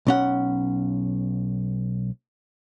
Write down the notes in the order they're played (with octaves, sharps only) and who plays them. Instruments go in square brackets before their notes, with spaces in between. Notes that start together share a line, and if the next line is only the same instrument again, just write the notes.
[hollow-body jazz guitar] B1 C#4 F#5